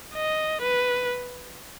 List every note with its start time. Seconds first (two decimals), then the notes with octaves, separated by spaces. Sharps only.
0.14 D#5
0.62 B4